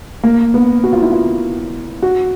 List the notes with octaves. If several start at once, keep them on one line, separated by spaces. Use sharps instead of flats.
A#3
B3
F#4
F4
E4
F4
F#4